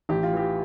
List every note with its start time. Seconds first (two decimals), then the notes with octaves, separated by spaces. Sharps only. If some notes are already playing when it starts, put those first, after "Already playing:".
0.09 A1 G4
0.23 F4
0.33 E3 G4